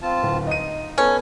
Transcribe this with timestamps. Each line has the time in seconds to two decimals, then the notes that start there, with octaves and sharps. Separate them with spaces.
0.02 C4 F4 A5
0.23 D1
0.47 D#4 D#5 D#7
0.98 B3 C#4 A4